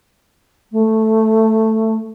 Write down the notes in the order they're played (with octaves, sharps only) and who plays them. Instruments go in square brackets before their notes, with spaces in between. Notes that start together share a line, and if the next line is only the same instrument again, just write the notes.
[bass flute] A3